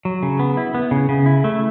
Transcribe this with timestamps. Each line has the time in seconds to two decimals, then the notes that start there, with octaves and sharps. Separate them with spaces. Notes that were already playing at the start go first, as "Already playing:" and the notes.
0.05 F#3
0.23 C#3
0.39 B3
0.57 E4
0.74 B3
0.91 C#3
1.09 C#3
1.26 E4
1.44 A3